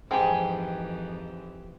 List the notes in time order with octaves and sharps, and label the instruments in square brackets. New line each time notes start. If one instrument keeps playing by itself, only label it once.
[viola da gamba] F2 E3 [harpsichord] G#2 [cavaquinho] G4 G#4 G5